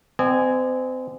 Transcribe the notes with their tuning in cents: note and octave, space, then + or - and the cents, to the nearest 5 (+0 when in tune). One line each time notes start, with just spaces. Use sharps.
C4 -30 D#5 -40 G#5 +0